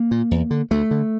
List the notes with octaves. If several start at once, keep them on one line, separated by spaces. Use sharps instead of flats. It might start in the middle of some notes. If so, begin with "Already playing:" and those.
Already playing: A#3
A#2
E2
D3
D2 A3
D3